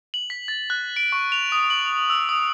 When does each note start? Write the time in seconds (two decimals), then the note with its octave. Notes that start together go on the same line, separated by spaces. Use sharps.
0.14 F#7
0.30 B6
0.48 A6
0.70 F#6
0.96 D7
1.12 C#6
1.32 F7
1.52 D#6
1.70 F#7
2.10 E6
2.29 D#6